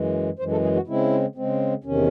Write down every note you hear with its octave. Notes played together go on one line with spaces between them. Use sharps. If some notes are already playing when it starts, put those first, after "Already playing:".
Already playing: F#2 E3 G#3
F#2 E3 G#3 C5
A4
G#4
F#4
C#3 G#3 C4 E4
C#3 G#3 C4
E2 C3 D#3 C#4